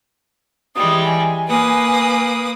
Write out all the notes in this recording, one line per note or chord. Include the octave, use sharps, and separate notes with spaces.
E3 G3 G#3 D#6
G#5
A#3 B4 D#6